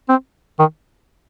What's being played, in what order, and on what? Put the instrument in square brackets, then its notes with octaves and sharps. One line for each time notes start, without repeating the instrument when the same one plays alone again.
[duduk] C4
D#3